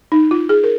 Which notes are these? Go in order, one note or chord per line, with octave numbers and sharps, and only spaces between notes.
D#4
F4
G#4
A#4